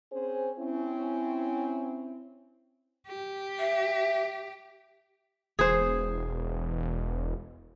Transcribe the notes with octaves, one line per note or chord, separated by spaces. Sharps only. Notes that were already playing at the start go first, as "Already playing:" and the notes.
C4 C#4 G#4 C5
C4 C#4 E4
G4
E5
E1 G#4 C5